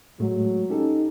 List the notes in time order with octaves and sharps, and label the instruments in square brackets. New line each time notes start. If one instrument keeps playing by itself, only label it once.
[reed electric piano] A2 G#3 A3 [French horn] F#3
[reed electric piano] C#4 G4 A4 [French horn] D#4